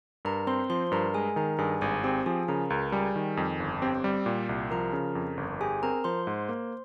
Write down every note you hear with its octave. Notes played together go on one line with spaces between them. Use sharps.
G2 A#4 A#5
C4 C5 C6
F3 C5 C6
G2 A#4 A#5
G#3 G#4 G#5
D#3 A#4 A#5
G2 G#4 G#5
G#1 G#4 G#5
C4 G4 G5
F3 G#4 G#5
C#3 A#4 A#5
C#2 A#4 A#5
G3 G#4 G#5
D#3
F2
G1
C4 G4 G5
G3
A#2
C2
F3 A#4 A#5
C#3
F2
G1
G4 G#4 G#5
C4 A#4 A#5
F3 C5 C6
G#2
A#3